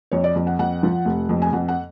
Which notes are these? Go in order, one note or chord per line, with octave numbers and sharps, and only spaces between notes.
F2 C#5
D5
F2
F#5
F2 F#5
F3
F1
F2
G#5
F2 F#5
F#5